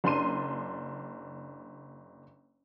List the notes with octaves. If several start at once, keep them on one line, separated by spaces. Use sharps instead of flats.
F#1 D4 C6 D#7